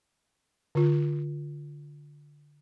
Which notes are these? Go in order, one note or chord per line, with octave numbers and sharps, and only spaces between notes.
D3 F4